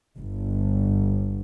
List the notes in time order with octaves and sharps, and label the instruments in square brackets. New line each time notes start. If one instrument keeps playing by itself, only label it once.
[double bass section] G1